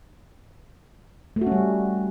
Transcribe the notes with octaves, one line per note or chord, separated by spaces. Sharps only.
A3
F#4
C#4
G3